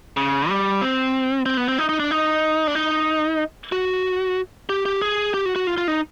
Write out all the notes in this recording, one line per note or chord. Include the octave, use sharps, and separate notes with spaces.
C#3
G3
C4
C4
B3
C4
D#4
D#4
D4
D#4
D4
D#4
F#4
G4
G4
G#4
G4
F#4
F#4
F4
F4
D#4